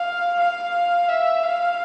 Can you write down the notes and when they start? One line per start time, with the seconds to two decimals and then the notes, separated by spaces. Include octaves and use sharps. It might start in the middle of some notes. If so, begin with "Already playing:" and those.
Already playing: F5
0.39 F5
1.08 E5
1.43 F5